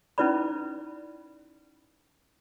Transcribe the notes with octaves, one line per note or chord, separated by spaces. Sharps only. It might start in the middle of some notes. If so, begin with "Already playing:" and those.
C#4 D#4 E4 B4 D5 B5